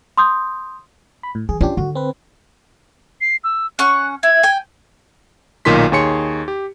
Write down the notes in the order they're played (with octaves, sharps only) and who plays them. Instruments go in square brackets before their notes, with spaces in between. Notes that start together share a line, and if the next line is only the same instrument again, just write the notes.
[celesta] C6 D#6 G6
[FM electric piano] B5
A2
[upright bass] E3 [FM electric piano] G#4
[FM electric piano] C#4 D4 G4 [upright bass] F4
[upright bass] D3 [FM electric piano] F#4
[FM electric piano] C4 B4
[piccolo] C7
E6
[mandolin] C#4 F#5 C#6 [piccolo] F#6
[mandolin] E4 [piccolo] G#6
[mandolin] G5 G#5
[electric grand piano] B1 A#2 D#3 F4 C6 B6
D#2 D#4 G#4 C#5 C6 C#7
G4